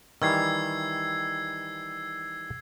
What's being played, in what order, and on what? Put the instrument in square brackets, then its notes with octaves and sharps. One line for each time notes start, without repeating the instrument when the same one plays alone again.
[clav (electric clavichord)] D#3 E3 G3 [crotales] E6 G#6 C7